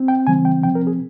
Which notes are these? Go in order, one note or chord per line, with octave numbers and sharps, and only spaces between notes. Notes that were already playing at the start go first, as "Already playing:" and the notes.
Already playing: C4
G5
C#3 E3 G3 C4 G#5
G5
C3 F3 C4 G5
A#4
G#4